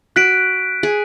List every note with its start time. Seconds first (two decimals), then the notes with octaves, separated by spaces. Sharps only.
0.16 F#4 F#6 B6 D7
0.83 G#4